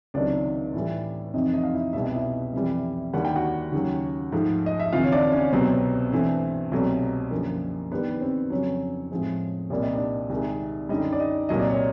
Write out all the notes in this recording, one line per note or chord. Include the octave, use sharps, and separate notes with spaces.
C#2 C3 D#3 F#3 D4 D5
A2 E3 G3
F2 C3 E3 D#4 D#5
D#4 D#5
F5
E4 E5
C2 B2 G3 B3 E5
D#5
E4 E5
F2 C3 E3 G3
D#2 D3 G3 A#3 F#5
G5
F#4 F#5
D#2 C#3 F#3
G#2 F3 A3
D#5
E5
D2 C3 E3 F4 F5
C#5
D4 D5
C#4 C#5
C2 B2 F#3 B3 C4 C5
G2 E3 A3 C4
C2 B2 F#3 A3
F#2 D3 F3 A#3
G2 D#3 G3 B3 B4
C4 C5
F2 C#3 F#3 C#4 C#5
A2 F3 G#3 C4
C2 A#2 G3 A#3 D5
D#5
D4 D5
C2 C3 D#3 G#3
F#2 D3 G3 D#4 D#5
D5
D#4 D#5
C2 A#2 F#3 D#5
D5
C#5